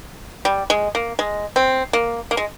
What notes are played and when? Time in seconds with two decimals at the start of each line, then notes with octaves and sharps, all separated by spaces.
0.45 G3
0.70 G#3
0.95 A#3
1.19 G#3
1.56 C4
1.93 A#3
2.31 A#3
2.37 G#3